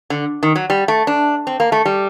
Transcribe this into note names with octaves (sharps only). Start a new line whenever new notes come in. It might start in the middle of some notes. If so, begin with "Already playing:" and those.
D3
D#3
F#3
G3
A3
D4
C4
A#3
A3
G3